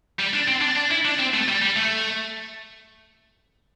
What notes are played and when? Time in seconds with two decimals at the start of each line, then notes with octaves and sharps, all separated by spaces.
0.19 G3
0.34 D4
0.48 C4
0.62 D4
0.77 D4
0.91 E4
1.05 D4
1.19 C4
1.34 A3
1.48 G3
1.62 G3
1.76 A3